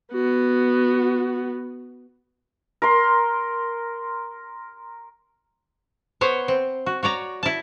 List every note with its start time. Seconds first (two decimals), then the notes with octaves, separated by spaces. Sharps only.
0.13 B3 F#4
2.82 A#4 C6
6.21 B3 C5 C#5
6.48 C4
6.86 F#4
7.03 F#4 C#5 D5 A#5
7.43 E4 A5